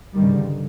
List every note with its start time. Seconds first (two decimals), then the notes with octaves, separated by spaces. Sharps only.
0.14 G2 D#3 G3
0.23 C#3
0.33 D3